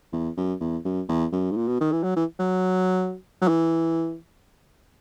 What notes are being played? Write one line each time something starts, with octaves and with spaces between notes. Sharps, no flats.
E2
F#2
E2
F#2
E2
F#2
G#2
A#2
B2
D#3
E3
F#3
E3
F#3
F#3
E3